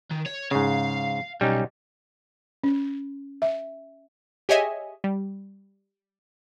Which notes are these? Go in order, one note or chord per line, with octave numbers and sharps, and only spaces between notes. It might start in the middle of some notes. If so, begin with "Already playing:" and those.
D#3
C#5
G#2 C#3 F5
B1 G3 C#4 D#4
C#4
E5
G4 G#4 C#5 D#5 E5 G#5
G3